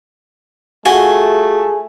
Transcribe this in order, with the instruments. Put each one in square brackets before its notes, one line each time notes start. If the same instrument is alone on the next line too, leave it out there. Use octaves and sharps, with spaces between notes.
[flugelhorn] A3 [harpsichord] F4 F#4 [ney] G#4 [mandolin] G#5